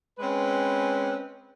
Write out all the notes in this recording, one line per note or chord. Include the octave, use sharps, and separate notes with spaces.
G#3 C4 C#4 B4